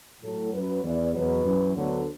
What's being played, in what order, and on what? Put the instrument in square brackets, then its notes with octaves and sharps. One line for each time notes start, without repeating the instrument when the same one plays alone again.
[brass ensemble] A2 F#3 A4
F#2 F#3 B4
E2 E3 D5
E2 B2 F#3 B4
F#2 E3
D2 D3 F#3 B3